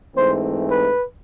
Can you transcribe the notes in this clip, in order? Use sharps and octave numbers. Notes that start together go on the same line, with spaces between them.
G#2 E3 A3 C4 C5
B4